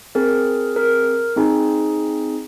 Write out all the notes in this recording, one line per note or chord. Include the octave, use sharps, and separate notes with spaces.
C4 G#4 A#4
A#4
C4 D#4 G#4